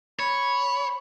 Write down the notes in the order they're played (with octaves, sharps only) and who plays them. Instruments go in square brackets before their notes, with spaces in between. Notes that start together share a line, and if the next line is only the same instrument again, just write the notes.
[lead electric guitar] C#5 [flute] B5